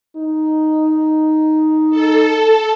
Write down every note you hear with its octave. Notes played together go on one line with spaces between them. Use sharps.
D#4
A4